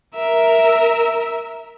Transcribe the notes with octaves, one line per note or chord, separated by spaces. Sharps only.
A#4 E5